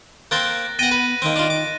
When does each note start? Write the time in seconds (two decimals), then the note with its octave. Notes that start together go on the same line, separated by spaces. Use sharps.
0.31 A#3 C4 C5 F#6 A6 A#6
0.79 B3 F#5 G5 A6 A#6 D#7
0.92 B4
1.22 D#3 A#3 C4
1.36 D4 F4
1.50 D6